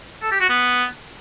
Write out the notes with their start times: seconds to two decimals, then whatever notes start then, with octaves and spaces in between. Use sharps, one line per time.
0.23 A4
0.32 G4
0.40 F#4
0.49 B3